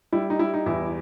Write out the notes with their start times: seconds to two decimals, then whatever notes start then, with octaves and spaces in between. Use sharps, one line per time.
0.12 G3 E4
0.30 D#4
0.39 G3 E4
0.54 D#4
0.66 E2 E4